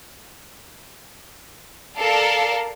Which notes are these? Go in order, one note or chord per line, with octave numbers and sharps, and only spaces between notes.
A4 A#4 D5 F5